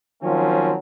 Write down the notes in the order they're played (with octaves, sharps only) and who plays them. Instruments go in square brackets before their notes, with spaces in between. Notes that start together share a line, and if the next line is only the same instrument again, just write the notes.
[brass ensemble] D#3 F3 F#3 A#3 C4 C#4